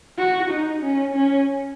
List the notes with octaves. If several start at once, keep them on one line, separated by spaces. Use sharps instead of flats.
F#4
D#4
C#4
C#4